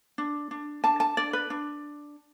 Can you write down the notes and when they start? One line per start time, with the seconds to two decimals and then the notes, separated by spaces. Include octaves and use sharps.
0.18 D4
0.51 D4
0.84 D4 A5
1.00 A5
1.17 D4 D5
1.33 B4
1.50 D4